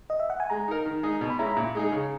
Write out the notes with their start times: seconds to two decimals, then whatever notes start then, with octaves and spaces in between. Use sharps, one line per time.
0.10 D#5
0.20 E5
0.30 F#5
0.40 G#5
0.50 G#3 A#5
0.68 D#4 A#4
0.86 D#3
1.03 G#3 D#4 G#4
1.21 B2
1.30 B5
1.39 G#3 C#4 E4 A#5
1.47 B5
1.57 A#2 A#5
1.75 G#3 D#4 G#4
1.92 C#3